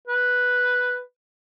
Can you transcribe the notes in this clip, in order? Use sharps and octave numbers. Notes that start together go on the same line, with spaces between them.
B4